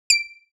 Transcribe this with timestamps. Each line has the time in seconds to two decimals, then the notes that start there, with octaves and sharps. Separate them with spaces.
0.10 D7